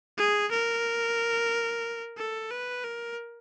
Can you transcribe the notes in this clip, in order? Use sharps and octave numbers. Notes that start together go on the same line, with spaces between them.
G#4
A#4
A4
B4
A#4